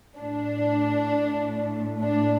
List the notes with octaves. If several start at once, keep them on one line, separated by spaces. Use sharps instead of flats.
A2 A3 D4
D4